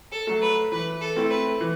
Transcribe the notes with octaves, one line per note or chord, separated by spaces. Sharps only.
A4
F#3 A3
B4
E3 B4
A4
A3 C4 E4
B4
E3